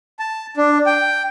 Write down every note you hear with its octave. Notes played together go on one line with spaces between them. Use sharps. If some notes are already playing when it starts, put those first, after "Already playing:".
A5
D4
G5